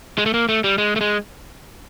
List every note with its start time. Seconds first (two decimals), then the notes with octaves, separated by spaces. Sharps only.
0.18 G#3
0.26 A3
0.34 A#3
0.49 A3
0.64 G3
0.78 G#3
0.96 A3
1.01 G#3